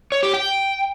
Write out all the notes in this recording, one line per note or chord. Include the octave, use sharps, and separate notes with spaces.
C#5
G4
G5